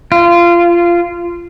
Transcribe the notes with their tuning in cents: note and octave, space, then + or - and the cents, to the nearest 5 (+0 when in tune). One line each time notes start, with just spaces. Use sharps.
F4 -20